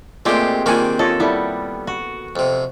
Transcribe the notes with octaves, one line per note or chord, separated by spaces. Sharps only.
A#2 G#3 A3 C4 F4 G4 D5
D#3 A#3 C4 D4 F4 G#5 C#6
F4 A4 C#5 D#5
G3 B3 E4 A4
F#4
F2 C3